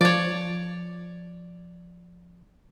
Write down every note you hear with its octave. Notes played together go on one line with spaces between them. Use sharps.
F3 C#5 D5